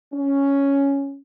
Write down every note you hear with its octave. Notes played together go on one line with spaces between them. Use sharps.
C#4